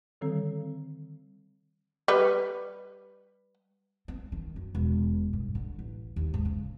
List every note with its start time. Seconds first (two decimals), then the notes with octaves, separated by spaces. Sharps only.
0.21 D3 D#3 G3 C4 A4
2.08 G3 B4
4.08 C4
4.32 D#3
4.56 F#2
4.75 E1
5.33 G2
5.55 D3
5.79 A1
6.16 D#2
6.34 G#2
6.45 C#3